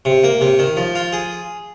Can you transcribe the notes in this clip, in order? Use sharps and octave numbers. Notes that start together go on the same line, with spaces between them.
C3
A#3
C3
D#3
F3
F4
G#4